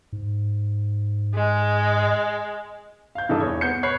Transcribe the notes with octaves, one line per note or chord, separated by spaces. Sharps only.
G#2
G#3
F5 G6
G2 E3 D#4 A4 D#6
E2 C#5
B3 G6 C#7
C#5 B5 F#6 C7